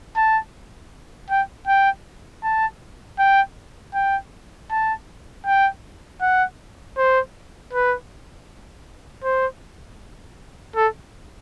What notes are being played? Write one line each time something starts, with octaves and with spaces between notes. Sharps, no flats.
A5
G5
G5
A5
G5
G5
A5
G5
F#5
C5
B4
C5
A4